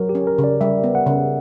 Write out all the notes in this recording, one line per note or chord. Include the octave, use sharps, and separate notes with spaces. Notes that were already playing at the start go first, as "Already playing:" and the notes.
Already playing: F#3 A#4
G4
C#4
A#4
C#3
D5
G3 E5
B3
F#5
C#3